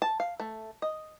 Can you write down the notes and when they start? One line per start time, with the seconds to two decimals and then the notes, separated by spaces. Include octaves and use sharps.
0.02 A5
0.20 F5
0.40 A3
0.82 D#5